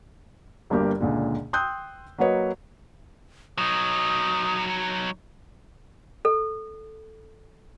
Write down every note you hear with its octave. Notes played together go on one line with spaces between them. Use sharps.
G1 G2 A#3 G4
C#2 A#2 D3
G5 C6 D#6 E6 F#6 G6
F#3 A#3 F#4 B4 C#5 D#5
F#3 D#4 D#6
A4